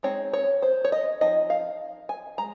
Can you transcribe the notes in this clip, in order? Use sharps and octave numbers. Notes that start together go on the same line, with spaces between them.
G#3 C4 D#4 C#5
C#5
C5
C#5
D#5
F3 C4 D#4 D#5
F5
G#5
G#3 A#5